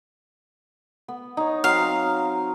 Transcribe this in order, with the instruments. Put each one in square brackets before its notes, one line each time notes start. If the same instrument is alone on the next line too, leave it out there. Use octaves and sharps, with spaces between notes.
[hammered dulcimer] B3
D#4 C#5
[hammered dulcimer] F#3 C4 [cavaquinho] F5